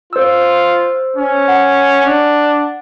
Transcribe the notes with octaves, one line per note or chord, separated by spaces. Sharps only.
F4 C5 E6
C#4
F#5
D4